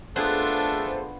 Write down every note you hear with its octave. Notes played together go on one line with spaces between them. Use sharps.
A3 B3 D4 F4 G#4 A4 C5